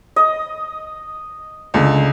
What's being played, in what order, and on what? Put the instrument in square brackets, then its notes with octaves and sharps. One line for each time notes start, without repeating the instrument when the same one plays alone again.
[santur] D#5
[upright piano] C#2 D3